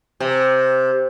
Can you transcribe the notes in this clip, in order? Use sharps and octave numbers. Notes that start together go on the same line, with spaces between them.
C3